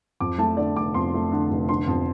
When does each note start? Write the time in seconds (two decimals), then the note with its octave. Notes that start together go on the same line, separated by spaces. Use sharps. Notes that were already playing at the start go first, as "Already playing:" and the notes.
0.20 F2 D6
0.38 A3 A5
0.57 D3 D5
0.77 F1 D6
0.94 F2 C6
1.14 A3
1.32 D3
1.50 F1
1.69 D3 C6
1.88 F2